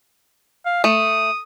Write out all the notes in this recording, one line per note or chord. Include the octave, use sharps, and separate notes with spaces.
F5
A3 D#6